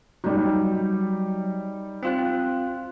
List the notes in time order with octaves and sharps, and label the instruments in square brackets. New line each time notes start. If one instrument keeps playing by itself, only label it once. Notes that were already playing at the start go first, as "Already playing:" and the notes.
[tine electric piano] F#3 [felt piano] G3 D#4
[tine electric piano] C4 F4 F#6